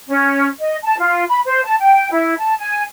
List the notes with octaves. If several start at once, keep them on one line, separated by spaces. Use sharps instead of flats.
C#4
D#5
A5
F4
B5
C5
A5
G5
E4
A5
G#5